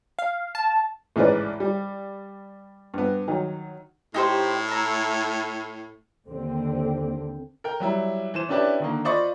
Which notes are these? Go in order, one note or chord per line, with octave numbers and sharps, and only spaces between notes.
F5
A5
A1 G#2 C#3 E3 B4 D5
G3
G2 B3
D#3 F#3
A2 D#4 G4 C5
E5 A#5
D#2 D3 C4
A#4 G5
F#3 G3 E4
E3 C5 E7
C#4 D4 E4 G4 B4 D5
D3 D#3 A#3
F4 C5 D5 D#5 B5 C#6